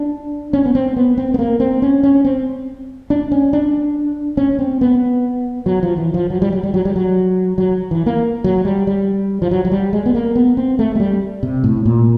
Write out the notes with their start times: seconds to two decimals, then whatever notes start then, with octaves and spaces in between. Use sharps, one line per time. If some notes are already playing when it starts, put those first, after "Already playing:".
Already playing: D4
0.53 C#4
0.66 B3
0.75 C4
0.96 B3
1.18 C4
1.34 B3
1.39 A#3
1.60 C4
1.82 C#4
2.03 C#4
2.25 C4
3.10 D4
3.32 C#4
3.53 D4
4.37 C#4
4.59 C4
4.81 B3
5.66 F#3
5.83 F3
5.98 E3
6.14 F3
6.30 F#3
6.42 G3
6.53 F#3
6.63 G3
6.74 F#3
6.85 G3
6.96 F#3
7.58 F#3
7.91 E3
8.06 A#3
8.44 F#3
8.65 G3
8.87 G3
9.42 F3
9.51 F#3
9.65 F#3
9.71 G3
9.93 G#3
10.06 B3
10.15 A#3
10.36 B3
10.57 C4
10.79 A3
10.95 G#3
11.00 G3
11.43 C3
11.64 A2
11.86 A#2